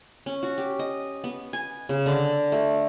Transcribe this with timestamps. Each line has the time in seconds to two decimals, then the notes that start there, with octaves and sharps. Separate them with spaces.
0.26 C#4
0.43 F#4
0.58 G4
0.79 D#5
1.24 B3
1.53 G#5
1.89 C#3
2.06 D3
2.52 A3